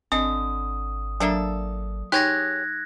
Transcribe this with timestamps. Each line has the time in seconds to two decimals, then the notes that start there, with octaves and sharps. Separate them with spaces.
0.12 G#1 D3 C4 D#5 D#6
1.20 F#3 A#3 D4 A4 E5 A#5
2.12 D#4 G4 G#4 C#5 F#6 G#6 A#6